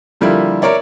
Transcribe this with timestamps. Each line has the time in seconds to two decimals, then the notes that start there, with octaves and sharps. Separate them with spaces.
0.21 D3 F3 G3 A#3 E4
0.62 A#4 C#5 D5 E5